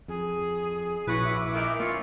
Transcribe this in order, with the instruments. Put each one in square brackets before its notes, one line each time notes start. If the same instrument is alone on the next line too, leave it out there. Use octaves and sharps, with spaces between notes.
[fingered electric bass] F2 [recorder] G#4
[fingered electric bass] A#1 [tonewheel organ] A#2 E4 [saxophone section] C#4 F#4 B4
[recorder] E4 [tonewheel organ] E5 D6
[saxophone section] A#2 D#3
[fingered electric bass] A#3 [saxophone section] C#4 F4